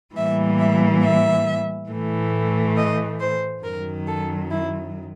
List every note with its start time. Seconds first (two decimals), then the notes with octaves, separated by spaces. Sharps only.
0.16 A2 E3 G3 A#3 E5
0.59 E5
1.03 E5
1.90 A2 E3 A3
2.76 D#5
3.20 C5
3.63 F#2 D#3 F#3 A#4
4.06 A4
4.50 E4